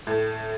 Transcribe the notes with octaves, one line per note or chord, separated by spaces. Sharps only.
A2